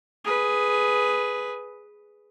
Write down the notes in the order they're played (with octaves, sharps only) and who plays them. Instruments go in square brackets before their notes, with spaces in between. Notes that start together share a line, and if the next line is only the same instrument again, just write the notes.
[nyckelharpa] G#4 B4